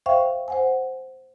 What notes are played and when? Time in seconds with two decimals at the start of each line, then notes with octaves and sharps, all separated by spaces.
0.06 C5 E5 F5 G5 C#6
0.48 C5 F#5 G#5